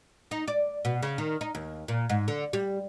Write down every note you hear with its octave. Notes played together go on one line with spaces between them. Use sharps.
D#4
D5
B2
C#3
D#3
D#4
D#2
A#2
G#2
D3
G3